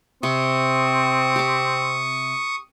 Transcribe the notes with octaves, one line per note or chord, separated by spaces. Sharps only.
C3 C4 C#6 D#6
G4 D6